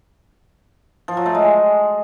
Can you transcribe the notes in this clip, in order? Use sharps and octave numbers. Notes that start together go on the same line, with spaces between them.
F3
F#3
A3
G#3